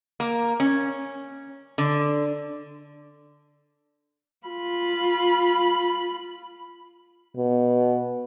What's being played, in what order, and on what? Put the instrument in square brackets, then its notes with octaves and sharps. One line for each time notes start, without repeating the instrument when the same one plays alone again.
[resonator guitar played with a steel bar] A#3
C#4
D3
[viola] F4 B5
[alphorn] B2